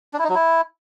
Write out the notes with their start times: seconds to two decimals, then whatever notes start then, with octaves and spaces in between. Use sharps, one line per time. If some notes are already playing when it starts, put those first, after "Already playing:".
0.13 D4
0.19 E4
0.24 D#4
0.29 F#3
0.35 E4